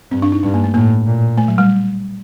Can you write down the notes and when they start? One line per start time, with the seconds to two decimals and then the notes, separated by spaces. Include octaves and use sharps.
0.11 G2 C4
0.22 D4
0.32 D#4
0.43 G2 D4
0.54 A#3
0.64 A3
0.74 A2 A#3
1.06 A#2
1.37 A3
1.48 F#3
1.58 G3